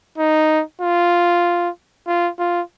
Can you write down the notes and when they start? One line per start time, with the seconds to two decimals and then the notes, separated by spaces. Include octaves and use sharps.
0.18 D#4
0.81 F4
2.08 F4
2.39 F4